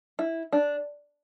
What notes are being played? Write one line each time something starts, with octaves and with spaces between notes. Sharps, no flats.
E4
D4